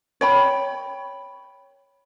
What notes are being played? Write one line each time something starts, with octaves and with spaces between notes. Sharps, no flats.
C#5 G5 B5